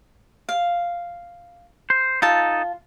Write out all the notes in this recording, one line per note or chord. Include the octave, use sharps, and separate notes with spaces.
F5
C5
D#4 F4 A4 A5